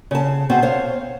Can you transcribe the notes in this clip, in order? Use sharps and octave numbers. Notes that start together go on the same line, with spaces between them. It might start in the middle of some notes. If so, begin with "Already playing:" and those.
C#3 A5
B2 C4 F#4
C5 C#5 F5